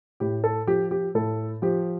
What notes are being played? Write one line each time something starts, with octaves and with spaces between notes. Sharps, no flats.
A2 G4
A4
F3 G4
G4
A2 A4
F3 G4